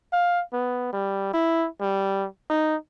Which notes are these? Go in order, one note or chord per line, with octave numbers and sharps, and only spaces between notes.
F5
B3
G3
E4
G3
D#4